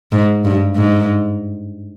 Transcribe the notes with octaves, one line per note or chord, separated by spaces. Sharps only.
G#2
G2
G#2